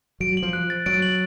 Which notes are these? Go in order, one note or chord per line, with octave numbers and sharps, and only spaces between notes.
F#3 D7
F#7
F3
F#6
A6
F#3 D7
F#7